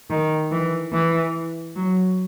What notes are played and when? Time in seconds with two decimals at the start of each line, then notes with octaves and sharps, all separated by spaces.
0.10 D#3
0.52 E3
0.92 E3
1.76 F#3